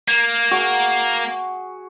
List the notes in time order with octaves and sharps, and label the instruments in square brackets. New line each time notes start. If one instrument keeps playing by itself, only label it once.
[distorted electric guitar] A#3
[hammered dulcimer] F#4 G#4